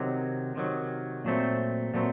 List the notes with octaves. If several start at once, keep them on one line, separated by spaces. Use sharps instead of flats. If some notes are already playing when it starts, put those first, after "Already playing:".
Already playing: C3 D#3 F#3
C3 D#3 F#3
A#2 F#3 A3 C4
A#2 F#3 A3 C4